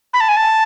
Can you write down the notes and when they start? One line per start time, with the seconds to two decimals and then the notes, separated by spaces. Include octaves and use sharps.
0.14 B5
0.21 A5
0.29 G#5
0.37 A5